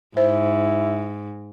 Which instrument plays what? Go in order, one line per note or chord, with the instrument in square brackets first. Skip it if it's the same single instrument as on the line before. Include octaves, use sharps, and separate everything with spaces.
[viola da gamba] G#2 [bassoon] E4 [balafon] C5